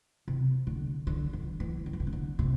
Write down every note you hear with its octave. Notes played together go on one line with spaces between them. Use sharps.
C3
D3
D3
E3
E3
D3
E3
D3
C3
D3
C3